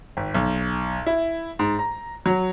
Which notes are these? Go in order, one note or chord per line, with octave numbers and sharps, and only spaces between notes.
G#1
B1
E4
G#2
A#5
F#3